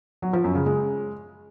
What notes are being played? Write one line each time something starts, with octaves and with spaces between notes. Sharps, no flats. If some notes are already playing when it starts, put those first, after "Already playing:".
F#3
F3
F#2
C#3
G#3